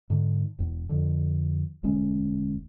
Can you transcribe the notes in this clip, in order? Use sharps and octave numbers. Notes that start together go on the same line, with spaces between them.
G#2 D3
E1 E2
F2 D3
E1 D2 G#3 C#4